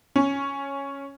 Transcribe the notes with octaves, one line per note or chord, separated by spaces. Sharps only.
C#4